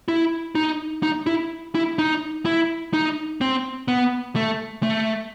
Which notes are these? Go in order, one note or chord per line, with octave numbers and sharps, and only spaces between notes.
E4
D#4
D#4
E4
E4
D#4
E4
D#4
C4
B3
A3
A3